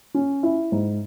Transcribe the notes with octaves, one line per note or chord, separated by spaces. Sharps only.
C#4
E4
G#2